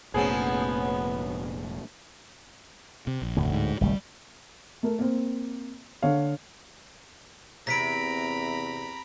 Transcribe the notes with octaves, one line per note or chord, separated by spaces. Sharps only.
F1 A#2 F3 F#3 A3 B3 C#4 G#4
C3
A#1
F1 D2 A2
G#2
G#1 C#2 G3 A3
A3 A#4
A#3 C4
D3 C#5 F5
E2 C3 A#5 B5 A#6 B6 D7